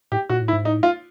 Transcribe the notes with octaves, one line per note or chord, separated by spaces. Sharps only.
A2 G4
A#2 F#4
A2
E4
G#2
A2 D#4
F4